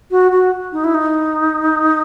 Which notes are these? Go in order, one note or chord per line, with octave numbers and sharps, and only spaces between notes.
F#4
F#4
D#4
E4
D#4